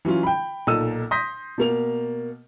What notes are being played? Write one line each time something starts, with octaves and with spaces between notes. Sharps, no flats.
E3 F#3 C#4 F4
G5 B5
B1 A#2 D#4 A4 E6 D#7
C6 D#6 G6 A#6 B6
B2 A#3 F7